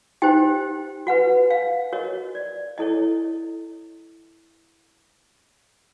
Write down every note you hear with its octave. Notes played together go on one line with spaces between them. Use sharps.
D#4 G4 C5 G5
F#4 B4 F#5
F5
F#4 A#4 C#5 D#5
D5
E4 A4 C#5 D#5